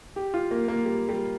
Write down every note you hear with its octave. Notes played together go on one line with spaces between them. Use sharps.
G4
F4
A#3
A#3
G3
G3